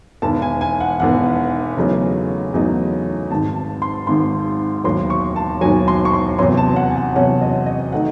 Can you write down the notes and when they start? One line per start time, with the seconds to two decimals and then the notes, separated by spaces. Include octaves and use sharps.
0.22 E1 E2 D#3 A5
0.42 G#5
0.61 G#5
0.80 F#5
0.99 E1 E2 D#3 F#5
1.77 E2 C#3 F#3 A3 D#4
2.54 E2 C#3 F#3 A3 D#4
3.31 G#1 G#2 D#3 A5
3.56 A5
3.82 C6
4.07 G#1 G#2 D#3 C6
4.84 E1 D#2 D#3 F#3 C6
5.10 C#6
5.36 A5
5.61 E1 D#2 D#3 F#3 G#5
5.88 C6
6.05 C#6
6.13 C6
6.38 E2 C3 F#3 C#4 C6
6.57 A5
6.76 F#5
6.90 G#5
6.96 F#5
7.16 E2 C3 F#3 C#4 F#5
7.41 D#5
7.66 D#5
7.92 D#3 A3 D#4 F#5